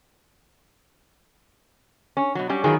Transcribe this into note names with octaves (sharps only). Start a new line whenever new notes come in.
C#4
B2 F#3
F#3 G3 C#4
D#3 F#3 B3 F4 G#4